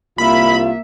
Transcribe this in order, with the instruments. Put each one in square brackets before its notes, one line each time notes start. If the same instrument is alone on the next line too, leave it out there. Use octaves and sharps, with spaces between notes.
[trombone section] C2 F4 [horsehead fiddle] A#3 E5 [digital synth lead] B5